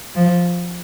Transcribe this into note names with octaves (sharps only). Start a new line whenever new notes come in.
F3